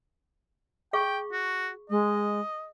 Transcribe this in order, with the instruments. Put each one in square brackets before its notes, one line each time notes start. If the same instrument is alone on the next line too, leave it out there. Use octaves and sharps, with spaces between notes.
[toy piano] G#4 F5 C#6 [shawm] G5
[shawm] F#4
[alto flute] G#3 [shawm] D#5